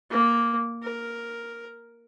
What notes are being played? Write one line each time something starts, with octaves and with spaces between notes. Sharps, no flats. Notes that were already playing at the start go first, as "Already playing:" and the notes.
A#3
A#4